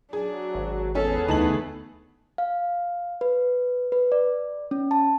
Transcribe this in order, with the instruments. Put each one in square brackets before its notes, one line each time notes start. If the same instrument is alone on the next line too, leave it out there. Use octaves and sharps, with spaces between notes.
[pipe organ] F#3 [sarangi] D4 [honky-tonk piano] G#4
[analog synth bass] G#1
[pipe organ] E2 B3 G#4 [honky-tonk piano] C#4 [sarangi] A4
[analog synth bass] D2 [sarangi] A3 [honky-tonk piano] D#4 A5 F#7
[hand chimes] F5
B4
B4
D5
C#4
A5